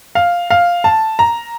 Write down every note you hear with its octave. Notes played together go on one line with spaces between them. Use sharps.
F5
F5
A5
A#5